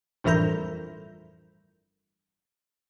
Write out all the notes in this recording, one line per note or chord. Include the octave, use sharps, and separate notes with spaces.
G1 F2 A2 E3 A#4 G6